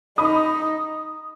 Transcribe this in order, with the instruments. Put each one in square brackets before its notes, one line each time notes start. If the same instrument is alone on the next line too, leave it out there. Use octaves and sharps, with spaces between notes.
[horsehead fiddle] D#4 [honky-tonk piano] B5 D#6